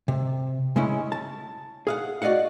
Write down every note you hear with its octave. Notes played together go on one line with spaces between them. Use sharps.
C3
C#3 G#3 C#4 E4
A5
G#4 F5 F#5
F#4 D5 D#5 F5 F#5